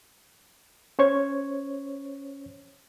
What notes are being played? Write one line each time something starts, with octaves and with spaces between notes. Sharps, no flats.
C#4 C5 C#5 C#6 G#6